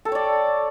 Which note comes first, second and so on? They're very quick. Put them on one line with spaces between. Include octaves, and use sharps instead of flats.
A4 G5 C#5 D5